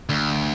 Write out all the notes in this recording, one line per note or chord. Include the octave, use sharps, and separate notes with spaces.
D2